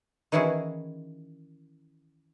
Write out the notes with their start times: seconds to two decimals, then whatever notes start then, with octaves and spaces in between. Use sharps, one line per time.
0.32 D#3 E3 C#4 E4 F#4 G#4